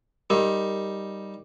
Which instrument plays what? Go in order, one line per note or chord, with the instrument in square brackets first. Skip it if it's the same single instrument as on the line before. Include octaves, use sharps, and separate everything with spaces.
[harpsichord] G3 D#4 [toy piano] G4 A#4